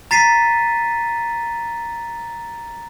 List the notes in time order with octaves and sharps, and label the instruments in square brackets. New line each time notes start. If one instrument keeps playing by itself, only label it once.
[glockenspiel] A#5 A6 B6 C7 D#7